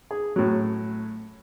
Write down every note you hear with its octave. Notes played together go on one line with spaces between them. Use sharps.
G#4
A2 F#3